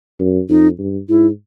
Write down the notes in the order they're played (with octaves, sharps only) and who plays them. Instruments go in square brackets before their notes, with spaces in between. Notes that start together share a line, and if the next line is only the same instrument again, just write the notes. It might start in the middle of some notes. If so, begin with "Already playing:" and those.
[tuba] F#2
[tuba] F2 [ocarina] D#4
[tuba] G2
[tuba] G#2 [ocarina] E4